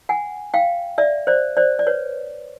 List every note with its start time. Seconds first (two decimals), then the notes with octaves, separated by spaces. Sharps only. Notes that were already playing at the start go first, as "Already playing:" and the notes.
0.09 F#5 G#5
0.54 F5 G5
0.98 D5 E5
1.27 C5 D5
1.57 C5 D5
1.79 D5
1.87 B4 C#5